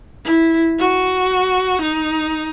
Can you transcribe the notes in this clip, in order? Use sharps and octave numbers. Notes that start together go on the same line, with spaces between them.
E4
F#4
D#4